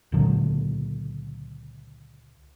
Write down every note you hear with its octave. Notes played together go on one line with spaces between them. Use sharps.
C#2 A#2 D3 F#3